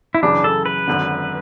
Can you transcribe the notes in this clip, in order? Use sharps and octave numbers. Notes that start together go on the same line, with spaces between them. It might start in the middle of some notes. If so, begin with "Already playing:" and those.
E4
F#2 C#3 E3 D4
A4
B4
G#1 F#2 D3